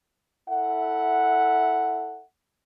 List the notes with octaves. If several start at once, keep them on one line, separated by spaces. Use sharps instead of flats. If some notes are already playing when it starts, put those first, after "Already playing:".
E4 A4 E5 F#5